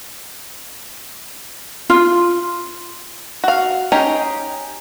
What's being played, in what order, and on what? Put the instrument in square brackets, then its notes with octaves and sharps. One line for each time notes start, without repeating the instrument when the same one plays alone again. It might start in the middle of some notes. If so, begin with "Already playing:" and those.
[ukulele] F4
[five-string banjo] F#4 F5
C#4 D#4 G4 G#4